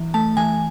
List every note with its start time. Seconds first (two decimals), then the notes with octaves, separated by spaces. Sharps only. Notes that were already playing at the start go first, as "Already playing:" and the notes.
Already playing: E3
0.14 A3 A5
0.37 E3 G#5